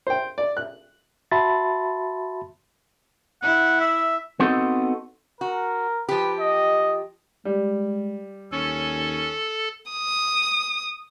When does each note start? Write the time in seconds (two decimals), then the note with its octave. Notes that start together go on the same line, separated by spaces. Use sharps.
0.07 C5 G5
0.38 D5
0.57 F#6
1.31 F#4 E5 A5 B5 C6 A6
3.42 E4 F#5
3.80 E5
4.40 B3 C4 D#4 F#4 A4 D#5
5.41 F#4 A#4
6.09 F3 G4 B4
6.40 D#5
7.45 G3 G#3
8.52 D#2 C#4 A4
9.92 D#6